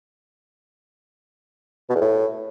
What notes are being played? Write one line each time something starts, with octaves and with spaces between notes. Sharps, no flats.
B2
E2
A2